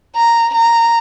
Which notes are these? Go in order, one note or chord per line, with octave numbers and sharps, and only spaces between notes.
A#5
A#5